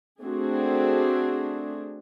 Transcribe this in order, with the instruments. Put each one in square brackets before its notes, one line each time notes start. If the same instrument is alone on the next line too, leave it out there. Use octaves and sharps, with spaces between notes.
[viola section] A3 C4 D4 F#4 G#4